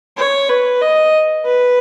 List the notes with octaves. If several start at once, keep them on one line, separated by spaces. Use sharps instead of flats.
C#5
B4
D#5
B4